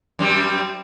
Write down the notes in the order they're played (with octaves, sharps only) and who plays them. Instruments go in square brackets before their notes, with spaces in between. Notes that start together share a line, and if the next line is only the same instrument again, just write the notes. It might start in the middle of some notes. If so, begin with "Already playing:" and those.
[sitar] F#2 G3 C4